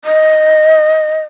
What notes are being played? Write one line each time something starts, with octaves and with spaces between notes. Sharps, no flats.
D#5